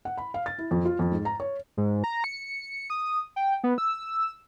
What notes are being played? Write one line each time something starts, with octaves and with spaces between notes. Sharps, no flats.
F#5
B5
F5
A6
E4
F2
F4
F2
G#2
A#5
C#5
G#2
A#5
C#7
D#6
G5
B3
E6